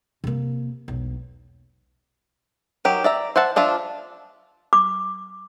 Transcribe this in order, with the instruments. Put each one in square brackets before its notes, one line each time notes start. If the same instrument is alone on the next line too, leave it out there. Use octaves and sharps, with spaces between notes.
[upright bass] C3 A#3
E1 B1
[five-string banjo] D#3 F#3 G4
D5 E5 A#5
C5 E5 F#5 A5
F3 D4 F4 E5
[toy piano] D6